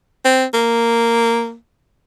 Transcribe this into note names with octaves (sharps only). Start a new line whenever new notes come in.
C4
A#3